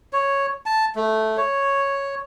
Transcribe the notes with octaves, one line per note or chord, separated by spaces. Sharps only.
C#5
A5
A3
C#5